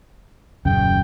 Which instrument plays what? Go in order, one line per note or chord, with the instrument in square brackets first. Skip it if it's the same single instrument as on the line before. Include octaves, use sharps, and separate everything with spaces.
[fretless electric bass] D#1 F#2 C#3 [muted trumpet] G5